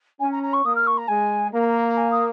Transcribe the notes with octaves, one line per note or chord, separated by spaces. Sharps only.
C#4 G#5
A#5
A#5
C#6
A#3 D#6
F6
C#6
A#5
G#3 G#5
A#3 A#5
A#5
A#5
G#5
D#6